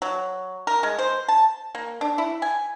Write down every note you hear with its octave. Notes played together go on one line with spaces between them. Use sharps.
F#3
A#4
G#3
C5
A5
A#3
D4
E4
G#5